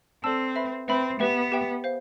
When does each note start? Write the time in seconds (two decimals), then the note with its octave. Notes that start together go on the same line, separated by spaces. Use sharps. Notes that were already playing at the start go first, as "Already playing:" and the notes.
0.23 C4 A4 D5 A5 E6
0.56 B4 E5 B5
0.88 C4 B4 E5 B5
1.20 B3 G4 B4 E5 G5
1.52 G4 B4 E5 G5
1.84 C5 F5